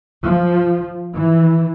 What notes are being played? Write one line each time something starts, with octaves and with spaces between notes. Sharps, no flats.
F3
E3